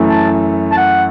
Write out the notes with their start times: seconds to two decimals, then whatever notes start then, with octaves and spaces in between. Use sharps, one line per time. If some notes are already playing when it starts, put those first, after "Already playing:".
Already playing: F#2 E3 A3
0.09 A5
0.72 A5
0.77 F#5